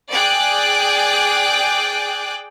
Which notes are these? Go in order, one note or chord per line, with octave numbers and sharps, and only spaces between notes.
G#4 D5 G5 D6 F#6